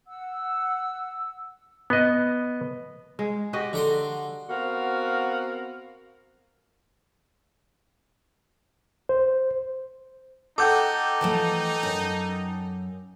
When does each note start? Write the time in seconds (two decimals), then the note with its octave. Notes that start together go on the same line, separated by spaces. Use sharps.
0.07 F#5 E6
1.90 B3 D#5
3.19 G#3
3.53 F#4 G4 D#5
3.73 D3 A#5 C6
4.49 B3 C4 F#4 A#4 F5
9.09 C5
10.58 D#4 A4 F#5 G5 D6 G6
11.21 E3 F3 A3
11.83 F#2